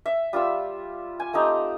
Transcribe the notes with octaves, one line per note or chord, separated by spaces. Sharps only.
E5
G3 F4 E5 E6
G#5
A3 C4 D#4 G4